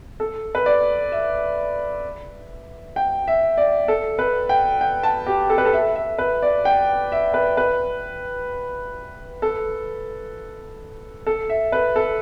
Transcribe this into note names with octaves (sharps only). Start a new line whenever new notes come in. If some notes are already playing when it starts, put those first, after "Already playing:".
A4
B4
D5
E5
G5
E5
D5
A4
B4
G5
G5
A5
G4
A4
B4
A4
E5
E5
B4
D5
G5
E5
B4
B4
A4
A4
E5
B4
A4